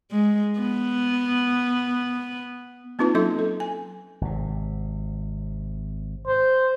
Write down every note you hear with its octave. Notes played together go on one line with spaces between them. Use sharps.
G#3
B3
A#3 C4 D#4 F4 B4 A5
F#3 C#4 E4 A4 E5 C6
A4
G#5
G#1 C3
C5